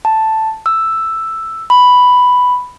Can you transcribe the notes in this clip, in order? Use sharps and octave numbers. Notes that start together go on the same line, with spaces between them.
A5
E6
B5